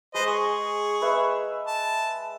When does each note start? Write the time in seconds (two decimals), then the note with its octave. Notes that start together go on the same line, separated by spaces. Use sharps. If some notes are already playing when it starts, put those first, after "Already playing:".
0.14 G#3 B4 C5 D#5
0.26 G#4 C#6
1.02 B4 D#5 E5
1.67 A5